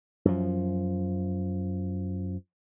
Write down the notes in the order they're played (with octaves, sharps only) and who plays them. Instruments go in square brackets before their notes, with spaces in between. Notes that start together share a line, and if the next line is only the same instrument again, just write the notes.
[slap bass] F#2 F3